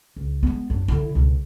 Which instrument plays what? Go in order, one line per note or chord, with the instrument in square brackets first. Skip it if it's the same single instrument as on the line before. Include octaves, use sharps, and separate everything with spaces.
[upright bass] C#2
G#3 B3
F#2 D4
D3 E4
C#2 B2